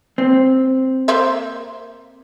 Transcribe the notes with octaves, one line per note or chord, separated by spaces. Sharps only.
C4
A#3 C5 E5